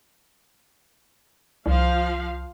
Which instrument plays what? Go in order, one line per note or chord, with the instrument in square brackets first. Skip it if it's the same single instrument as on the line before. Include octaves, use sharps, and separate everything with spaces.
[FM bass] C2 [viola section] F3 F5